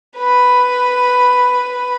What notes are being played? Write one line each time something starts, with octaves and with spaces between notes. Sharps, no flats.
B4 B5